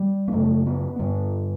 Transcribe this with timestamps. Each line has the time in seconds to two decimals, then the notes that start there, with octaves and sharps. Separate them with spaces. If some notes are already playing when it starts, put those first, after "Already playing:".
Already playing: G3
0.28 B3
0.32 F#2 C#3 A3
0.66 B3
0.99 G2 D3 B3